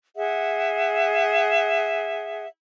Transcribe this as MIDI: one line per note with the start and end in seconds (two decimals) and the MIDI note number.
0.16 2.46 68
0.16 2.46 76
0.16 2.46 78